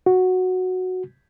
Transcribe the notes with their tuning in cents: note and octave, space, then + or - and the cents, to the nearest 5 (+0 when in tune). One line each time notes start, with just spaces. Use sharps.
F#4 -5